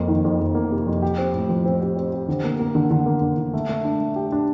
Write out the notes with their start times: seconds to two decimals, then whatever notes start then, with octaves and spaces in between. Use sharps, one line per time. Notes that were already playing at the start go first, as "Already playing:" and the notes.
Already playing: F2 A#3
0.08 D#3
0.25 F2
0.40 F2
0.55 A#3
0.72 C3
0.87 F2
1.02 G4
1.18 C4
1.33 A2
1.49 F3
1.66 C4
1.81 G4
1.97 C4
2.13 G4
2.28 D3
2.44 A#3
2.59 A#3
2.75 D3
2.91 D3
3.06 A#3
3.22 D3
3.38 D3
3.54 A3
3.69 A3
3.84 D4
4.01 A3
4.16 G4
4.32 D4